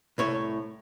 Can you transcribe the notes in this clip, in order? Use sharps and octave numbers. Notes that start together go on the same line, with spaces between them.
C2 A2 C#5